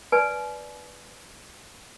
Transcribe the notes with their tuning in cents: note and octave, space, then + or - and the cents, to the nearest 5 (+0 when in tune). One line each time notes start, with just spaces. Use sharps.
B4 +0 D5 +0 G#5 +45